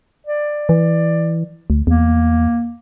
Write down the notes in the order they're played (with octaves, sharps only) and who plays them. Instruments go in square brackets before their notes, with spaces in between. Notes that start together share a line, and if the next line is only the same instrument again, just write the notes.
[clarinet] D5
[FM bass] E3
D2
[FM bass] E2 [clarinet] A#3